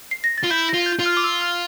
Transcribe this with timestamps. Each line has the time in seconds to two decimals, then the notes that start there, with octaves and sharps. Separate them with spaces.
0.11 C7
0.24 A#6
0.38 A6
0.44 F4
0.51 E4 G6
0.69 F4 A#6
0.86 G6
0.99 F4
1.06 F6
1.17 D6
1.24 E6
1.41 F6